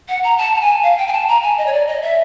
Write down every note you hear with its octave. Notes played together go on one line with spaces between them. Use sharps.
F#5
A#5
A5
A5
G#5
F5
G5
G#5
A5
A#5
G#5
D#5
C#5
D5
D#5
E5